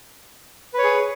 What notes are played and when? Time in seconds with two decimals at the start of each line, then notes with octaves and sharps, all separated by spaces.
0.74 B4
0.79 C#5
0.84 G#4